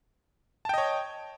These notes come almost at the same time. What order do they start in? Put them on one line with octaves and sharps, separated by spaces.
A5 G5 D#5 C#5